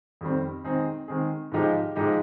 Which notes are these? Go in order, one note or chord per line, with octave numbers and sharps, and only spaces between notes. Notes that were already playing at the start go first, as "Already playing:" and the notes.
F2 D#3 G3 C4
D#3 G#3 C4 D#4 G#4
D#3 G#3 C4 D#4 G#4
G#2 F3 G#3 D#4 G4
G#2 F3 G#3 D#4 G4